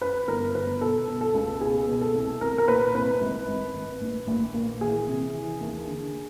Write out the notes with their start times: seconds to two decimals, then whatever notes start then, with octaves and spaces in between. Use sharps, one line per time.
0.01 F#2 B4
0.28 G1 A#4
0.55 G1 B4
0.81 B2 A4
1.08 B2
1.21 A4
1.34 C#2
1.61 B2 G#4
1.88 B2
2.01 A4
2.15 C2
2.41 C2 A#4
2.58 A#4
2.67 A#2 B4
2.94 C2 B4
3.21 G#1
3.48 G#1
3.74 G#1
4.01 A#1
4.27 A#1
4.54 A#2
4.81 E3 G#4
5.08 C3
5.34 E3
5.61 D#2
5.87 D3